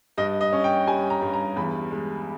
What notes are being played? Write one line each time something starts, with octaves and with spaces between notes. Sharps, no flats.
G2 D#5
D#5
C#4
G5
G3 G#5
A#5
G2
A#5
E2 B5
G#3